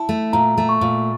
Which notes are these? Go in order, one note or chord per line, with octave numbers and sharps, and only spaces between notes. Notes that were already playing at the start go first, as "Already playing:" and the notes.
Already playing: E4 A5
A3
A#2 A#5
A3
C#6
A#2